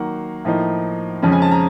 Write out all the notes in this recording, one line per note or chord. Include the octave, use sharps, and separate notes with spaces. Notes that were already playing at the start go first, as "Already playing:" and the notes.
Already playing: D#3 F#3 A#3 F#5
A2 F3 A#3 D#4
F2 C#3 F3 G#3 C#4
G#5
A5
A#5